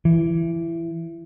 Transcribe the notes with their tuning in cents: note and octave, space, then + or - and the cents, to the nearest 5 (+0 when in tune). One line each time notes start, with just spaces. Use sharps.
E3 +20